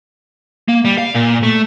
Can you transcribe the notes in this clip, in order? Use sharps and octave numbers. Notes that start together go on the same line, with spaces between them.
A#3
G3
F5
A#2
A3